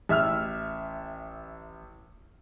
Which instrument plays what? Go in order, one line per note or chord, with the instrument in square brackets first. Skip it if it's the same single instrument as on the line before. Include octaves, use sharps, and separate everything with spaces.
[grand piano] A1 E5 E6 F6